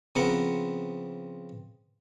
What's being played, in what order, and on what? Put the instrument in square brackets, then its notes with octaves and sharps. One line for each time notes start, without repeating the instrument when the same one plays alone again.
[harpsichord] C#3 F3 B3 C4 A#4 F#5